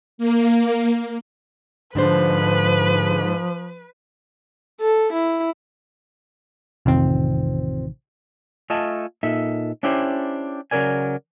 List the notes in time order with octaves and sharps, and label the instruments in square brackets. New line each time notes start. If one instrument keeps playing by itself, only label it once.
[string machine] A#3
[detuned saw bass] G#2 [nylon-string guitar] D3 D4 C5 [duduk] F3 [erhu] B4
[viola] A4
E4
[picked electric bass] A1 C3 D#3 [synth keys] F2 C4
[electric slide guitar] A3 F4 D#5 G#5 A5
A#2 D#4 A4 E5
C#4 D4 E4 G4 C5
C#3 F#3 A#4 D5 G#5